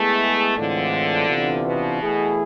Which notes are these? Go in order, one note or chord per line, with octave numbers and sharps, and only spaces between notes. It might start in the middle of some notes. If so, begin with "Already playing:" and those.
Already playing: G#3 A3 B3 E4 G#4
A2 D3 E3 G#3 C4 F4
C3 E3 B3 D4 F4
B2
E3 A3 E4 G#4